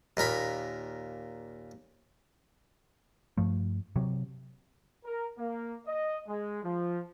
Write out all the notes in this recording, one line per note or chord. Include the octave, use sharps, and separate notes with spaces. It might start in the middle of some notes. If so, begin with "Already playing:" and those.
D#2 A#2 A#4 B5
G2 F3 A3
C3 F#3
A#4
A#3
D#5
G#3
F3